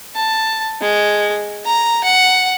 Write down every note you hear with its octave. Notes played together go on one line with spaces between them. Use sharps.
A5
G#3
A#5
F#5